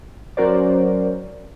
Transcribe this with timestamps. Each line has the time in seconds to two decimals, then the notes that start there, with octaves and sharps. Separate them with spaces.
0.37 F#3 C#4 F#4 A#4 C5 D5